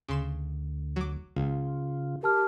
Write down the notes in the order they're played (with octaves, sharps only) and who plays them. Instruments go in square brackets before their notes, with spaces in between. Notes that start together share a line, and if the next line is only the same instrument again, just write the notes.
[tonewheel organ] D2 [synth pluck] C#3 C6 E7
[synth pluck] F#3 D6
[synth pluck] C#2 [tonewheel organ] C#3 F4
[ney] G4 [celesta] A#4 A5 F6